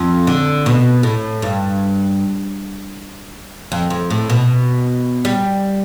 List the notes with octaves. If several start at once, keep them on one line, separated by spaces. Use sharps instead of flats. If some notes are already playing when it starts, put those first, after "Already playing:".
Already playing: F2
D3
B2
A2
G2
F2
F2
A2
B2
G3